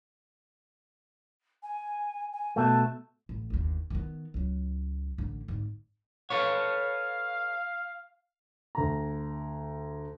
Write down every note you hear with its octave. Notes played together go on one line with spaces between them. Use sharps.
G#5
G#5
B2 A3 A5
A1
G1 D#2
D#3 B3
C#2 F#3
A1 D3
G#1 D3
A4 B4 C#5 F5
D2 A#5